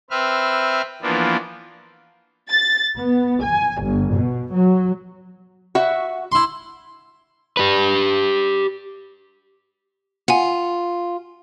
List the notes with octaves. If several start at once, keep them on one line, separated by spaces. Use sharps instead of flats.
C4 B4 E5 F6
E3 F3 A#3 B3 D4
A6
B3
G#5
G1
B2
F#3
F#4 E5
E4 C6
G4 B4
F4 F#5 G#5